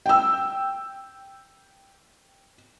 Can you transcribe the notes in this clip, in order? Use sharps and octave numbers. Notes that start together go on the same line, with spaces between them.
G5 E6